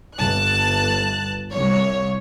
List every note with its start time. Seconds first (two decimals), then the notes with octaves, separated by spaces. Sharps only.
0.16 G1 A5 F#6
1.50 C2 C#5